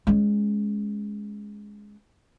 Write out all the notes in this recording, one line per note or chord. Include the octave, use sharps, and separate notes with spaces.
G#3 C#4